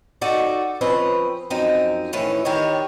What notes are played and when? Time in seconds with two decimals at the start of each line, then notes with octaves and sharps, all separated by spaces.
0.21 D#4 F#4 A4 D5 D#5
0.81 F3 C4 C#4 B4 D#5
1.50 F#2 F3 C4 D#4 D#5
2.13 A2 D#3 E3 C#4
2.45 D#3 E3 D4 G4 C#5 D#5